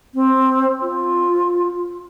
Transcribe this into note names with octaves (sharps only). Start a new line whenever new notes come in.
C4
F4